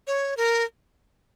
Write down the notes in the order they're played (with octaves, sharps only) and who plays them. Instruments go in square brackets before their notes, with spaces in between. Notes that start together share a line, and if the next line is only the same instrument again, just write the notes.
[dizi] C#5
A#4